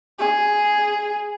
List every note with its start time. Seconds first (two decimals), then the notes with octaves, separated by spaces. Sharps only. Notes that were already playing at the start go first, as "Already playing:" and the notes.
0.19 G#4